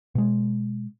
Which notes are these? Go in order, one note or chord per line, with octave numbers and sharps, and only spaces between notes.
B2 G#3